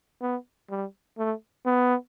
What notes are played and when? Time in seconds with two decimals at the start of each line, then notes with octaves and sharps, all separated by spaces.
0.22 B3
0.70 G3
1.18 A3
1.66 B3